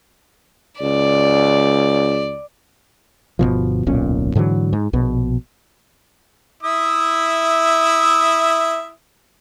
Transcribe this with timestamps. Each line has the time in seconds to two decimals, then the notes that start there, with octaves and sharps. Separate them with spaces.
0.81 C#2 D5
3.39 G1 C#2 B2 F3
3.86 D1 B1 A#2 C#4
4.35 G#2 D3 E3 F#3
4.73 G#2
4.93 A#1 B2
6.63 E4 E5 D#6